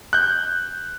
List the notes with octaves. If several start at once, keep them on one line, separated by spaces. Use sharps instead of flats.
F#6 G6